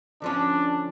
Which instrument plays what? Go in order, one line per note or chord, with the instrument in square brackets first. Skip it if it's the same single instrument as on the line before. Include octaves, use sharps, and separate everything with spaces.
[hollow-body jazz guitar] D3 F3 C#4 [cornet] D4